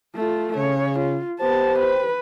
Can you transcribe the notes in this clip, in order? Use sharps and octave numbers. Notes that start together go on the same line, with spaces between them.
A3 F4
C#3 C#5
F4
B3 G4 C5 A5
B4